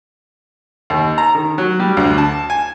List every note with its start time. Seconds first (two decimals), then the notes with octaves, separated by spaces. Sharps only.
0.90 D#2
1.18 A#5
1.35 D#3
1.58 F#3
1.80 G3
1.97 D2
2.18 A5
2.50 G#5